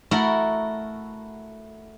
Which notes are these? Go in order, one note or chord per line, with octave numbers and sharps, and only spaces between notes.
A3 E4 F#4 A#4 F#5